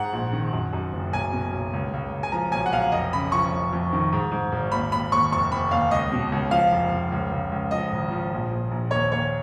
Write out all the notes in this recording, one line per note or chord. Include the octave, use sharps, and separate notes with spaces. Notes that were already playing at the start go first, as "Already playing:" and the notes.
Already playing: G#2 F#5
A#1
D#3
F#2
F#2
F#1
B1 G#5
B2
B1
C#2
C#2
C#2
G#5
F3 A#5
B1 G#5
F#5
B1 F5
F1 D#5
C#3 B5
F3 C#6
F1
F2
D#3
G#2
G#2
G#1
D#2 B5
D#2 B5
D#2 C#6
F1 C#6
F1 B5
D#2 F5
C#2 D#5
B2
C#2
F3 F5
F1
F1
C#2
C#2
C#2
F3 D#5
G#1
F3
A#1
A#1
A#1
D#2 C#5
D#2 C#5